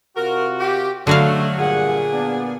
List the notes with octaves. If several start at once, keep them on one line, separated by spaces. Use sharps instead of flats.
C3 F4 F#4 A#4
G4
D3 F#3 A3 F#4 F5
G2 A#2 G#4 F#5
B3 D4